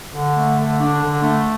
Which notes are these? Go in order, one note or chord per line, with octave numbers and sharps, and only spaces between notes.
D3
A3
D3
D4
D3
A3